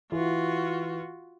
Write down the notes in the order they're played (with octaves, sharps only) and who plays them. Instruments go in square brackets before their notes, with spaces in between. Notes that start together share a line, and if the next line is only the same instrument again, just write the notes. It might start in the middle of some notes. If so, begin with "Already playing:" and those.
[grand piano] E3 [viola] F4 F#4